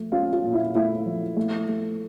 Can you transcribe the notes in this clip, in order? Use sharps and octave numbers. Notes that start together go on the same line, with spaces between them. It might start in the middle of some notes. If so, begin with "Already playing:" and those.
Already playing: F3 A3
C#4 F4
F4
A#2
E4
A3 E4
F3
A3
A3